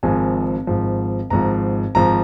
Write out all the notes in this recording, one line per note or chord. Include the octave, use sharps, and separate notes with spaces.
G#1 G#2 F3 G#5
G#1 G#2 F3
G#1 G#2 F3 A#5
G#1 G#2 F3 A#5